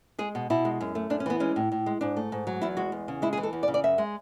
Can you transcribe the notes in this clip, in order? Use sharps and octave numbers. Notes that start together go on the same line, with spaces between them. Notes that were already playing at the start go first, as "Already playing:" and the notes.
G#3 G#4
B2
B2 E4
G#3
F#2
A3
F#2 D4
C#4
E3 B3
G#3 C#4
A2
A2
G#3
G#2 D4
A3
G#2
F#3
E2 E4
G#3 F#4
E2
C#3
G#3 E4
G#4
E3
A4
E2
D5
C#3
D5
F#2 E5
G#3